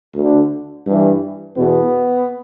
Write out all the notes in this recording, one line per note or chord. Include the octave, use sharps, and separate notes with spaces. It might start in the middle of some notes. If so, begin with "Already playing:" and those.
D2 D3
G2 E3
E2 B2 B3